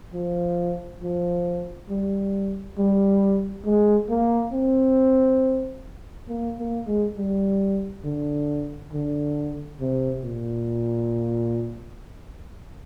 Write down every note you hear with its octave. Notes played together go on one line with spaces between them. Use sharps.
F3
F3
G3
G3
G#3
A#3
C4
A#3
A#3
G#3
G3
D3
D3
C3
A#2